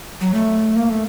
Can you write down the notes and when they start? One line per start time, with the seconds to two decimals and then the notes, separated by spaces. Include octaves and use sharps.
0.21 F#3
0.34 A3
0.76 A#3
0.90 A3